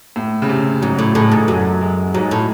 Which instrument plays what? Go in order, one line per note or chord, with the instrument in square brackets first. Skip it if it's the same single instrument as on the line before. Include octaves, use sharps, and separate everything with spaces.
[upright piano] A2
C#3
C3
[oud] G#2 [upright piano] F#3
[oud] A2
[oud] A2 [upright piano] G#3
[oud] G#2
[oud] F#2 [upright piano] F#3
[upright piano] G#3
[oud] G#2 [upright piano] F#3
[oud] A2